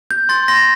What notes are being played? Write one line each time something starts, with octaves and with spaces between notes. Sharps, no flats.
G6
C6 A6
C6 A#6